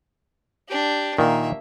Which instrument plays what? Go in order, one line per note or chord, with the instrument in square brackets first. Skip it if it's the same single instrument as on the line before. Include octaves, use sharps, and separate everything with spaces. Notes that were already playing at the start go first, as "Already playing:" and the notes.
[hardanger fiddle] D4 G4
[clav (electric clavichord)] A#2 D#3 [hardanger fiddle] A#3 E5